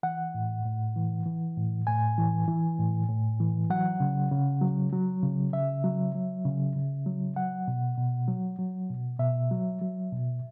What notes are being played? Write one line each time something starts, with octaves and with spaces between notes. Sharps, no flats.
E3 F#5
A2
A2
E3
E3
A2
A2 G#5
E3
E3
A2
A2
E3
F#3 F#5
C#3
C#3
F#3
F#3
C#3
C#3 E5
F#3
F#3
C#3
C#3
F#3
F#3 F#5
B2
B2
F#3
F#3
B2
B2 E5
F#3
F#3
B2